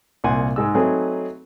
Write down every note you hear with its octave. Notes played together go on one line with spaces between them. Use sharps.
C2 A#2 F#5 G#5 C6
G#2 G#3 E6
F#3 A3 C4 D#4 G#4 B4